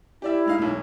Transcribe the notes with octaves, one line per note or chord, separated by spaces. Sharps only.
E4 G4 D5 E5
G#3 D#4 F5
E1 B1